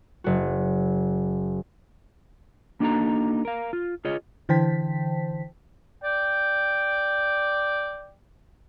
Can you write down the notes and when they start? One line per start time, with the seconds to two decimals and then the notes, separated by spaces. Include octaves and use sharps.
0.24 F#1 F#4
2.80 A#3 D4 D#4 F#4 A4 A#5
3.45 A#4 F5
3.73 F4
4.05 F4 G#4 C#5 D#5
4.49 D3 E3 C5 G5 A5 B6
6.04 D5 G5